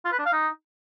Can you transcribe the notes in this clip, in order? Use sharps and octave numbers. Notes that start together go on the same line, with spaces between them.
F4
B4
D4
F5
D#4